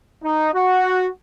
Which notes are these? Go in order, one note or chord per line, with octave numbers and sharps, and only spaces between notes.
D#4
F#4